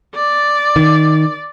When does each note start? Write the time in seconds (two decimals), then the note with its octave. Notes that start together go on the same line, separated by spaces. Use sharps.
0.15 D5
0.76 D#3